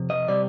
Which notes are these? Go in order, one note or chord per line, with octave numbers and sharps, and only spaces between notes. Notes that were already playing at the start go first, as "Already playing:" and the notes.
Already playing: F2 C3
D#5
C3 G3 D5